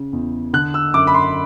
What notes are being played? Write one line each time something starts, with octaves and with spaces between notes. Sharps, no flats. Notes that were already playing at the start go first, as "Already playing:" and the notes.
Already playing: C#3
E2
D3 F#6
E6
F#2 D6
B5
C6